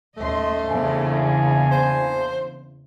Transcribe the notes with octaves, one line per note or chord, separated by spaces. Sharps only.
D#2 A3 C#4 D#5 C6
A#1 E2 C#3 G#5
C5